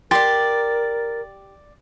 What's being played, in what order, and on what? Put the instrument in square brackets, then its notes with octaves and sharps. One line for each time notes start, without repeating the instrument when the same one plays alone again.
[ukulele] G4 [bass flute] A#4 [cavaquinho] D5 C6 [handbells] A6